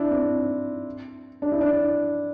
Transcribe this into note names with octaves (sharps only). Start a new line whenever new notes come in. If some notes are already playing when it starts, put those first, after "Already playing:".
Already playing: D4 E4
C4
D4
E4
D4